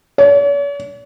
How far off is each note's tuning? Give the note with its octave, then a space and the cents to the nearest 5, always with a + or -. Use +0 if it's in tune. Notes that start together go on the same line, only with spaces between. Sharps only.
C#5 +45